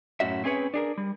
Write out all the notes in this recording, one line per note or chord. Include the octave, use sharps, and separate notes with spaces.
F#2 A2 C#4 F#4 E5
C4 C#4 G#4 B4 C#5
D4 G#4 A#4
G3